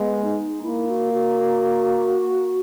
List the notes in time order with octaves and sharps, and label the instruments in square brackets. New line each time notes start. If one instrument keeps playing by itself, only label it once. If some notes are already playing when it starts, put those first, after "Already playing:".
Already playing: [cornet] G#3 [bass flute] B3
[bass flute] D#4
[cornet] A#3 [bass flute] E4
[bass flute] F#4
F#4